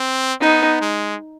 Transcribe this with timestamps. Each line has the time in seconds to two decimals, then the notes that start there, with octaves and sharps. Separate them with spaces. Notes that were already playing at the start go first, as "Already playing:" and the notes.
Already playing: C4
0.41 B3 D#4
0.81 G#3